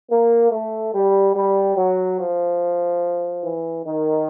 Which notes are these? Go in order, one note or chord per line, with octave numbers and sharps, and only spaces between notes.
A#3
A3
G3
G3
F#3
F3
E3
D#3